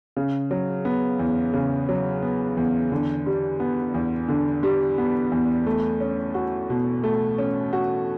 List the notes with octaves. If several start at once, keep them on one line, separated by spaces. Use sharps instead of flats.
C#3
F#3
B3
E2
C#3
F#3
B3
E2
D3
G3
B3
E2
D3
G3
B3
E2
A3
C#4
F#4
B2
A3
C#4
F#4